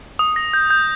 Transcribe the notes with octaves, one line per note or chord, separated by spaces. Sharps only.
D#6
A#6
G6
G6